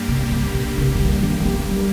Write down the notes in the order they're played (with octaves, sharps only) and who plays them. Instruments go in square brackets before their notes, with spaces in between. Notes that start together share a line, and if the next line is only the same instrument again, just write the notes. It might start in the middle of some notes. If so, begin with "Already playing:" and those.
Already playing: [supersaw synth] G2 G3 A#3 G4
[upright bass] C3
C3
A#2
C3
C3
D#3
D#3
D#3
F3
G3